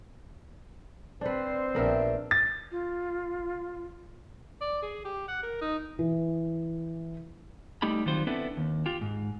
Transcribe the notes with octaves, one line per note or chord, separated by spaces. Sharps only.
C4 D4 B4 C5
A#1 B3 D4 A#4 E5
A6
F4
D5
G#4
G4
F#5
A#4
D#4
E3
G3 A3 D#4 G4 B5
D#3 F#3 G3 C4 F4 C5
B3 C4 D4 E4 A4 B4
D#2
F4 G4
G#2